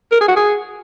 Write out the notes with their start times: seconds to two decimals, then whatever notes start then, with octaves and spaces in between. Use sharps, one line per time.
0.12 A#4
0.21 G#4
0.28 F#4
0.36 G#4